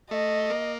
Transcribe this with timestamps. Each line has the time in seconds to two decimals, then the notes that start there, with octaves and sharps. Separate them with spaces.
0.11 A3 D#5
0.50 A#3